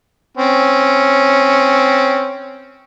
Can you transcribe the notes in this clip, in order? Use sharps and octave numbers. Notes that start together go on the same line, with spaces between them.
C4 C#4